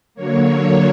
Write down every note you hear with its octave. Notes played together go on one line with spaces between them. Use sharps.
D3 F#3 A#3 C#5